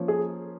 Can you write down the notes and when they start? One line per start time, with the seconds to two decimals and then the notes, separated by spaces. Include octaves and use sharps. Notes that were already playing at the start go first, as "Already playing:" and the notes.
Already playing: F3 A#3 C#4
0.08 G#4